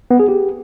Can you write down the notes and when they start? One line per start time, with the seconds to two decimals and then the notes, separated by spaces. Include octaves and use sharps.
0.11 B3
0.20 G#4
0.28 G4